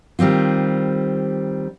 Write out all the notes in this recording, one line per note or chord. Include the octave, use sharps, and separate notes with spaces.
D#3 G3 C4 F4